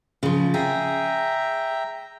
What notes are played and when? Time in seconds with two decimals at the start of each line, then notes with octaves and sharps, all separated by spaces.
0.23 C#3 F3
0.54 G#4 E5 G5 A#5